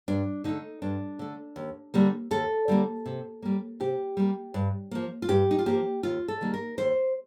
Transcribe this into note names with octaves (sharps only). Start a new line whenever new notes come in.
G2 D4
D3 A3 D#4
G2 D4
D3 A3
D#2
D3 G3 A#3
D#2 A4
D3 G3 A#3
C3
G3 A#3
C3 G4
G3 A#3
G2
F3 A#3
F4
G2 G4
D#4
F4
F3 A#3 G4
D#2 F4
A4
D#3 G3 A#3
A#4
D#2 C5